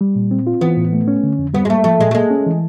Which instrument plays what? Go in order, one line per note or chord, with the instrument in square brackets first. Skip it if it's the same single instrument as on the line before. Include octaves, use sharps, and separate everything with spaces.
[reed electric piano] G3
A#2
C4
F4
[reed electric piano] E3 [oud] B3
[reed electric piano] A2
A3
C#4
D3
F2
[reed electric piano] G3 [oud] B3
[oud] G#3
[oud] A3 [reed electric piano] A#3
[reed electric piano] F3 [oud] A3
[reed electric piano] A#2 [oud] G#3
[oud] A3
[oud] G#3 [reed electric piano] A#3
[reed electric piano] C#4
E3